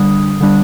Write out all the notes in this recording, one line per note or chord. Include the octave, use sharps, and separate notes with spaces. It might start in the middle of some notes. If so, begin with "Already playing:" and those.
Already playing: D3 G3 D4 D#6
D3 G3 D4